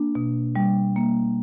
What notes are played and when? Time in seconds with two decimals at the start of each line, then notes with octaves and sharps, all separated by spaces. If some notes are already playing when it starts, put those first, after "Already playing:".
Already playing: A#3 D4
0.15 B2
0.56 G3
0.96 A#3